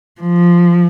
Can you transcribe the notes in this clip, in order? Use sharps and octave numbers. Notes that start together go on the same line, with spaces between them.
F3